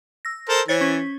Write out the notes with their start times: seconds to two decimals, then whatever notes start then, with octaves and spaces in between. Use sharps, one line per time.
0.25 E6 A#6
0.49 A4 A#4 C5
0.68 E3 C5 C#5 A6
0.81 C#4 B6